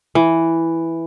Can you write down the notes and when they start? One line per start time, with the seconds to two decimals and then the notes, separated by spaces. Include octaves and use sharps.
0.15 E3